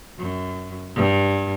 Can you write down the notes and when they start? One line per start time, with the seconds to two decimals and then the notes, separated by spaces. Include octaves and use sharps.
0.18 F#2
0.95 G2